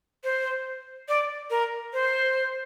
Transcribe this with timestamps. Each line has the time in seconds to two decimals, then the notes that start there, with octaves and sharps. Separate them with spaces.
0.24 C5
1.09 D5
1.50 A#4
1.93 C5